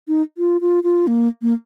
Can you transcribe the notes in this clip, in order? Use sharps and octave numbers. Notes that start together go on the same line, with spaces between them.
D#4
F4
F4
F4
A#3
A#3